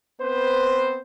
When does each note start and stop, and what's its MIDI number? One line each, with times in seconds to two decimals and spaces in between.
0.21 0.99 59
0.21 0.99 60
0.21 0.99 71
0.21 0.99 72